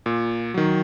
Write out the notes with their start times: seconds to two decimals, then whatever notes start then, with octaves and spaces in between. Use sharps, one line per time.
0.06 A#2
0.54 D#3 F#3